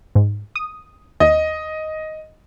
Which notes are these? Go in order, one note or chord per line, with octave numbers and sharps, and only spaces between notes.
G#2
D#6
D#2 D#5